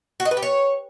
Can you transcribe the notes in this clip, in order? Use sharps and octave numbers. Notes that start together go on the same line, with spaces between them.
F#4
D#5
B4
G4
C#5